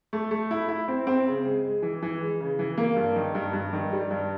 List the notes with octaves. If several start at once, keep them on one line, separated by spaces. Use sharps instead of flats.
A3
A3
E4
E4
C4
C4
C#3
G#3
G#3
E3
E3
G#3
C#3
E3
A#3
G2
D#3
G2
G2
D#3
G3
G2